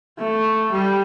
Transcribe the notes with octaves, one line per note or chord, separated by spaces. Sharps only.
A3
G3